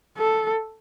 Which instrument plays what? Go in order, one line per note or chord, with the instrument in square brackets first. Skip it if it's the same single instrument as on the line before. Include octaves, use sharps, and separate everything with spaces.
[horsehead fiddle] A4